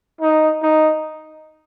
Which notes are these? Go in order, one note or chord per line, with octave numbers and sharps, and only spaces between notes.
D#4
D#4